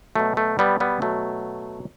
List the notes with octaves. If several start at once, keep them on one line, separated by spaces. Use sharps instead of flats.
B2 F#3 A3
A3
G3 B3
G3 B3
B2 F#3 A3